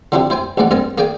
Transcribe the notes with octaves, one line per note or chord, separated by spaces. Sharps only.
D3 F3 C4 D4 E4 G4
E4 C5 G5 G#5
A1 G#2 E3 D5 F#5
G2 C4 A#4 G#5 A5
A#3 G#4 D5 G5 G#5